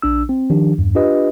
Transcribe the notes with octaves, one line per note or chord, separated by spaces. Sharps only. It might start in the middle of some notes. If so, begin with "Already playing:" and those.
A#1 D4 E6
C4
D#3 F3 D4 G4
E2 G2
D4 F4 G4 B4 D#5